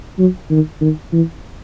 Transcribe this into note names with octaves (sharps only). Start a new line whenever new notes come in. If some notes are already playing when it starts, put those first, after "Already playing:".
F#3
D#3
D#3
E3